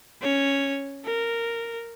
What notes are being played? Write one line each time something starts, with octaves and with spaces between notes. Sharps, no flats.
C#4 C#5
A#4